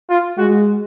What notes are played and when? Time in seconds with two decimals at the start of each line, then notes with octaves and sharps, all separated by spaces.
0.09 F4
0.38 G#3 F#4